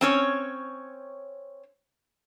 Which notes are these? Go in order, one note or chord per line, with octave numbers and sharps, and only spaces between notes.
C4 C#4 C#5